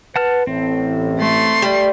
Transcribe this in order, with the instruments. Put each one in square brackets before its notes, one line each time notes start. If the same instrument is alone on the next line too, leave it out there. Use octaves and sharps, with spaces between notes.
[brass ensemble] B4 [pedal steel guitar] F#5 A5 F6
[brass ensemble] A1 A2 [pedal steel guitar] C4
[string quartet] A3 C6
[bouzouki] G3